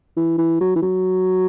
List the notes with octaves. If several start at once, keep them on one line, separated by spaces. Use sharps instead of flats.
E3
E3
F#3
E3
F#3